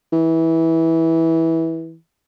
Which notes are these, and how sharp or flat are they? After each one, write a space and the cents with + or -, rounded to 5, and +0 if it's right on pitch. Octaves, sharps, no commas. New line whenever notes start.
E3 -15